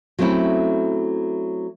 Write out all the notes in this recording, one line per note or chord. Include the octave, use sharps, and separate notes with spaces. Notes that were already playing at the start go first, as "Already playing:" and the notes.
F#3 A3 C4 C#4 E4